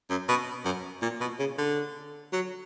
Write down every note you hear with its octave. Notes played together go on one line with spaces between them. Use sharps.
F#2
B2
F#2
A#2
B2
C#3
D3
F#3